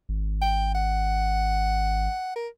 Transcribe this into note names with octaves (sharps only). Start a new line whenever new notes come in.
G#1
G5
F#5
A#4